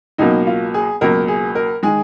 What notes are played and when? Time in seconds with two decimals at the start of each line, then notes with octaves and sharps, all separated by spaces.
0.18 C#2 B2 F#3 A#3 D#4
0.47 F4
0.74 G#4
1.01 C#2 B2 F#3 A#3 A#4
1.28 G#4
1.55 A#4
1.83 D#3 G#3 G#4